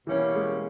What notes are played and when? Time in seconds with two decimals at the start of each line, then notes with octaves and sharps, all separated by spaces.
0.06 B2 E3 G3 A#3 C#4
0.35 G#3